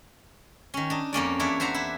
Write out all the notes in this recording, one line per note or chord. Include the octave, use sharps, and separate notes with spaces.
D#3 C#4
D4 D#4
F2 A#3 C#4 D5
E2 D4 E4 C#5 D5
D4 C5 E5 F#5 A#5
E4